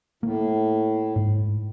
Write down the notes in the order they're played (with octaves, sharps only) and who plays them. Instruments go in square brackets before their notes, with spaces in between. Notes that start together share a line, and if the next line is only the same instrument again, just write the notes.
[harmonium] A2 [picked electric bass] A#3
[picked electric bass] G#2